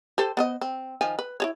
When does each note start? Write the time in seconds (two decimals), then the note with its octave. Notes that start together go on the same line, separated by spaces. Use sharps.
0.18 G4 A4 C5
0.37 B3 C5 D#5
0.61 C4
1.01 D#3 F3 G#5
1.19 B4
1.40 E4 G#4 C#5